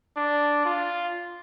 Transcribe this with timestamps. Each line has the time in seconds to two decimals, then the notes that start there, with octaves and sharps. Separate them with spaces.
0.17 D4
0.65 F4